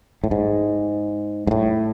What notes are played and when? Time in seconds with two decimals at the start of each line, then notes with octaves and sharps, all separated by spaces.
0.24 A2
0.31 G#2
1.47 G#2
1.51 A2